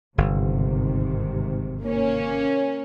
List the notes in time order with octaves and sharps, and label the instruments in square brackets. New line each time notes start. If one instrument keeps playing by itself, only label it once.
[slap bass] G1 [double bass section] G#2 C3 D#3
[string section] A#3 C#4